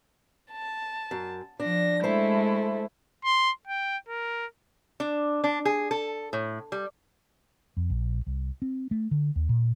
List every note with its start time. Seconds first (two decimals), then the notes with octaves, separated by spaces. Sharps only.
0.52 A5
1.11 F#2
1.60 F3 D4 A#6
2.04 G#3 A3 E4 C5 A5
3.25 C6
3.67 G5
4.09 A#4
5.00 D4
5.44 D4
5.65 G#4
5.91 A4
6.33 A2
6.72 G3
7.77 F2
7.90 A#1
8.26 C2
8.62 C4
8.91 A3
9.11 D3
9.36 D#2
9.49 A#2